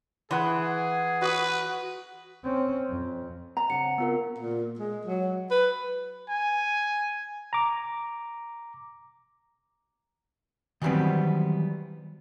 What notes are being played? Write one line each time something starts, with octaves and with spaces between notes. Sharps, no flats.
E3 G#4 F#5 C6
F#4 B4 D#6
C4 C#4
F2
D5 A#5
C#3 C4 F#5 C#7
B3 F4 A#4
A#2
G#3
F#3
B4
G#5
A#5 D6
D#3 E3 F#3 G3 B3 C4